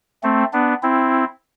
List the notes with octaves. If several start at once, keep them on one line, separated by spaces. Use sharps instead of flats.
A3 C4
B3 D4
C4 E4